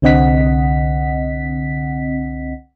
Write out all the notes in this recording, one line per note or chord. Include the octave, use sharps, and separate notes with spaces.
C2 D3 C4 D#5 F#5 B6